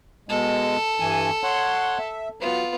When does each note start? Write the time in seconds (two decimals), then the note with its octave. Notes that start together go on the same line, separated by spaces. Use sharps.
0.29 B2 G#3 A4
1.00 G2 E3 G#5
1.44 C#5 F#5 C6
1.98 E5
2.41 F#3 B3 F4